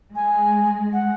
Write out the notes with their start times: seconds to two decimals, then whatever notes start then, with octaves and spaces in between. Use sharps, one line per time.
0.15 G#3 G#5
0.93 F#5